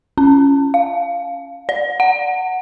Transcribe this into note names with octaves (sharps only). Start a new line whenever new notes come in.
C#4
F5
D5
F#5